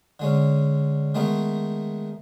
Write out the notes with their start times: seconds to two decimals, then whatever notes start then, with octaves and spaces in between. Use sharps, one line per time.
0.19 D3 G#3 C#4
1.15 D#3 G#3 A3 B3 D#4